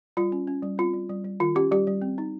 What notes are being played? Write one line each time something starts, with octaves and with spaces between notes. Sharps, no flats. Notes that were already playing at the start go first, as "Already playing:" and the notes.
G3 F4
C#4
C#4
G3
C4 F4
G3
G3
G3
D#3 F4
C#4 G4
G3 G4
G3
C4
D#4